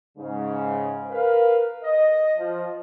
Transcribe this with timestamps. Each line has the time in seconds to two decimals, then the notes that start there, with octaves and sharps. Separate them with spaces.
0.18 G#2 C#3
1.11 A#4 B4 F5
1.84 D#5
2.38 F3